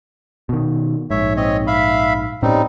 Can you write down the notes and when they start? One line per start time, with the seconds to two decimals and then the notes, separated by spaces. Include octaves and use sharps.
0.49 B2 D#3
1.11 A#1 G#2 C#5 E5
1.37 C4 C#5 D#5
1.67 E5 F5 B5
2.42 A2 G3 C4 C#4 D#4